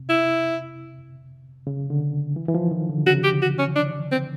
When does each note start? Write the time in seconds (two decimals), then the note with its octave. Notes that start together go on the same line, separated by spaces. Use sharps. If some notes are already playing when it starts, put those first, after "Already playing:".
Already playing: C3
0.09 E4
1.67 C#3
1.90 D3
2.36 E3
2.48 E3
2.54 F3
2.71 D#3
2.89 D3
3.06 C#3 F#4
3.24 G4
3.42 F#4
3.59 C#4
3.76 D4
4.11 C4